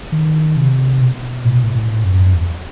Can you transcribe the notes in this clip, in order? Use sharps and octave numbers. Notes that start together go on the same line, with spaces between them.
D#3
C3
B2
A2
B2
A2
A2
F#2
E2